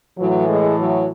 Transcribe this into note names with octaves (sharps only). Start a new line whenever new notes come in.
A2 E3 F#3
G#3
F#3